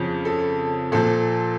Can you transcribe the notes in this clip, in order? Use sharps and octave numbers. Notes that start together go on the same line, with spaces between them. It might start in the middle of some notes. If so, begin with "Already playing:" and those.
Already playing: F2 C#3 F3
A4
A#2 F3 A4